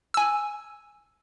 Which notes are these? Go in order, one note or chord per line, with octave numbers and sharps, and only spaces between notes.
G#5 E6